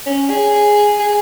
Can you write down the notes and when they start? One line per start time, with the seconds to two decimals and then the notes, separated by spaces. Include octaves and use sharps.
0.06 C#4
0.30 G#4
1.00 G#4